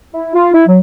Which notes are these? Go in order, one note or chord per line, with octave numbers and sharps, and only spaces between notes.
E4
F4
E4
F#3